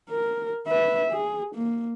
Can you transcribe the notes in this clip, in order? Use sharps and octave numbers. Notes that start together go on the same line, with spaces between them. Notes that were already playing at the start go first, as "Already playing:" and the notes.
A#4
B4 E5
G#4
A#3